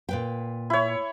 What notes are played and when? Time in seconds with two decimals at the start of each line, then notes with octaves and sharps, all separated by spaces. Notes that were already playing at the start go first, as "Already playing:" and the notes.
0.09 A#2 B4 G5
0.70 E4 C#5